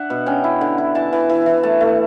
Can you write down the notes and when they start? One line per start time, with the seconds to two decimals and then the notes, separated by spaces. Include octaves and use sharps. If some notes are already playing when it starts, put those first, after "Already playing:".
Already playing: D4 E5 F#5
0.10 B2
0.26 C#4 G5
0.44 E4
0.61 D3
0.78 E4
0.95 E3 A5
1.13 E3
1.29 E3
1.46 E3
1.63 A3 A5
1.81 A3